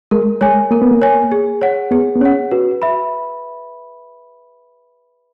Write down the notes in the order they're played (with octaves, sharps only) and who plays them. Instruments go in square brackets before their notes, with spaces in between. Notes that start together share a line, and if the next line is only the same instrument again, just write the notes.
[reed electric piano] G#3 [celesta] A#4
[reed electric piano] G#3 [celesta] C#5 G#5
[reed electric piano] A#3 [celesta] A#4
[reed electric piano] B3
A#3
[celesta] C#5 G#5
G#4
C#5 F#5
[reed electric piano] B3 [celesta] G#4
[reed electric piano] B3
[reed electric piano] C#4 [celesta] C#5 F#5
[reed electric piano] F#4 [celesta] B4
[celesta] E5 B5